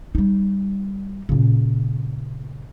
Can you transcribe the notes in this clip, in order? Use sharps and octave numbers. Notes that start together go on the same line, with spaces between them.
G3 D#4
A#2 C#3